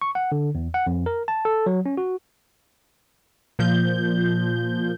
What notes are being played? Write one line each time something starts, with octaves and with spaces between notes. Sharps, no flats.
C#6
F#5
D3
E2
F#5
F2
A#4
A5
A4
F#3
C#4
F#4
A#2 F3 G6